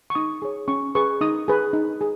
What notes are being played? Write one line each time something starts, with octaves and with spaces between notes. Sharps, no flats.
C#6
D#4 D#6
G#4 C#5
C#4 C#6
G#4 B4 C#6
D#4 D#6
G#4 B4
D#4
G#4